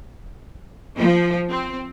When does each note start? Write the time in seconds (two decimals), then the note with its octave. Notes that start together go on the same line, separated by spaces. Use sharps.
0.97 F3
1.49 C4